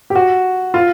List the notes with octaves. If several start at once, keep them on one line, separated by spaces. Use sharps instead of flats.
G4
F#4
F4